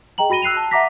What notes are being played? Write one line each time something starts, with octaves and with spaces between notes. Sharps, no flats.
G#4 D#5 G5 A#5 F#7
F#4 B5 A#6 D#7 G7
E6 F#6 C7 D#7 F7
A5
E5 F#5 A#5 D6 A#6 B6